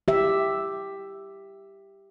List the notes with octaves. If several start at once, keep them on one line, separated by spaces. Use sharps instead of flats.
G4 E5